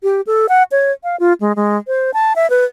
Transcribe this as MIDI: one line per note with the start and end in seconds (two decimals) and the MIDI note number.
0.03 0.21 67
0.27 0.46 69
0.49 0.63 78
0.71 0.92 73
1.03 1.16 77
1.19 1.33 65
1.40 1.52 56
1.56 1.77 56
1.87 2.11 72
2.14 2.33 81
2.36 2.49 76
2.50 2.65 71